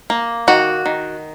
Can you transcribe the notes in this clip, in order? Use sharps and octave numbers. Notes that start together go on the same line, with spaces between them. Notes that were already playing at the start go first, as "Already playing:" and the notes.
A#3
D#3 F#4
D#3